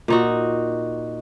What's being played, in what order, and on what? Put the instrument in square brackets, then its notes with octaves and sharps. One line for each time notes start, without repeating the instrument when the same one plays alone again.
[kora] A#2 D#4 F#4